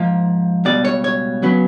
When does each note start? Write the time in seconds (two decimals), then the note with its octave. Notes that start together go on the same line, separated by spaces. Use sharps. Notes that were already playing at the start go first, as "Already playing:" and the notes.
Already playing: G#2 F3 A#3
0.65 C#2 B2 G3 D5
0.85 C#5
1.04 C#5
1.43 C#3 F#3 B3